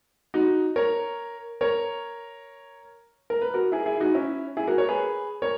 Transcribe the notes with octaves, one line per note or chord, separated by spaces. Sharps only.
D#4 F#4
A#4 C#5
A#4 C#5
A#4
B4
F#4 A#4
E4 G#4
E4 G#4
D#4 F#4
C#4 E4
E4 G#4
F#4 A#4
A#4 C#5
G#4 B4
A#4 C#5